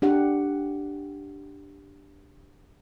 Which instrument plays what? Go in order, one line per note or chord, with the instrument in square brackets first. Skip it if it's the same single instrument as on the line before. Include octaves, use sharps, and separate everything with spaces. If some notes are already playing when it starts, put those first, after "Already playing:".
[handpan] D4 G4 F#5